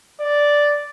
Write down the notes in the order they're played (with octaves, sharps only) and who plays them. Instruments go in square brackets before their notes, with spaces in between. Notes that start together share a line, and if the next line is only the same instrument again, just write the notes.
[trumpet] D5